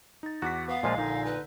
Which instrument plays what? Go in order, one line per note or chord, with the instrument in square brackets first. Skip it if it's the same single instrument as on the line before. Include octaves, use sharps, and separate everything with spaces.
[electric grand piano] D#4 A6
[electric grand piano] E2 D6 B6 [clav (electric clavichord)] F#4 [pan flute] F#5
[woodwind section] B3 [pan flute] F5
[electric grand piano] A#1 G#5 [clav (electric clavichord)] A#2 F3 F4 [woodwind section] G#3
[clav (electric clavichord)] A#2 [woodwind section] D3 D#4
[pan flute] B4